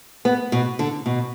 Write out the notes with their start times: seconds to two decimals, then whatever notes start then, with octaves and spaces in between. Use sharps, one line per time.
0.25 B3
0.52 B2
0.79 D3
1.06 B2